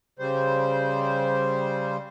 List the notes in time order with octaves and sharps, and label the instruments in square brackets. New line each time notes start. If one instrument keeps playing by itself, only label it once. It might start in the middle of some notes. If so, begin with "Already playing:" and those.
[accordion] C#3 G3 C5